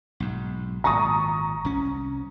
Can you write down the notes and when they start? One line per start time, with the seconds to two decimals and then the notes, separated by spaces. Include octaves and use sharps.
0.20 B1 G#2
0.84 G#1 A#2 A#5 C#6 D#6
1.65 C2 C#4